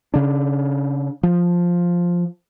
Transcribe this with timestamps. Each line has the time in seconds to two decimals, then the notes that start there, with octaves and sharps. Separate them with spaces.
0.14 C#3 D4
1.23 F3